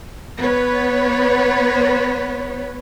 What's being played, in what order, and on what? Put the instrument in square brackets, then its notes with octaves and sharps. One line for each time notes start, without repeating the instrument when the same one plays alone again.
[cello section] B3 B4 C#5